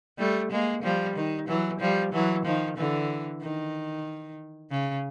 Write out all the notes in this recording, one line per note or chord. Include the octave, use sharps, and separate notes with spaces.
G3 A3
G#3 A#3
F3 G3
D#3
E3 F#3
F3 G3
E3 F#3
D#3 F3
D3 E3
D#3
C#3